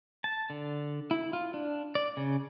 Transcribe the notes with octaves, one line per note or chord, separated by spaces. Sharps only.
A5
D3
E4
F4
D4
D5
C#3